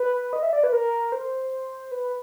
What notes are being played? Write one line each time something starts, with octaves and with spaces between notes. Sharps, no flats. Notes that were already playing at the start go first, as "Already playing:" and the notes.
Already playing: B4
D#5
E5
D5
B4
A#4
C5
B4